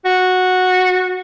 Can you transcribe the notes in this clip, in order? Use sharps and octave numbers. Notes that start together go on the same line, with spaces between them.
F#4